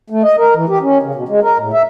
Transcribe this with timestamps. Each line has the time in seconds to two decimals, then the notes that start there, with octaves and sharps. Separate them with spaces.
0.10 A3
0.23 D#5
0.38 A#4
0.55 E3
0.69 G4
0.82 C#4
1.03 C#3
1.15 B2
1.29 G#3
1.43 A#4
1.58 A2
1.73 E5